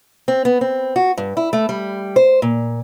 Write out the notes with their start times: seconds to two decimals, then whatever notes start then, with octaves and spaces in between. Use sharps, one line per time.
0.28 C4
0.45 B3
0.61 C4
0.96 F#4
1.17 G2
1.37 E4
1.53 A3
1.69 G3
2.16 C5
2.42 A#2